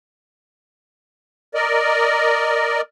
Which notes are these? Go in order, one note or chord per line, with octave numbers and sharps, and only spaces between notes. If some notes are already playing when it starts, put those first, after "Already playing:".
A#4 D5 D#5